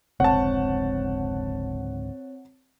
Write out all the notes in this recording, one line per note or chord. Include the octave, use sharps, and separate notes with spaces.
F1 C#2 G#2 D3 C4 C#5 F#5 A5